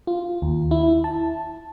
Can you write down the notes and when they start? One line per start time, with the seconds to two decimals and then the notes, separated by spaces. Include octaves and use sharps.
0.07 F4
0.42 D#2
0.71 E4
1.04 A5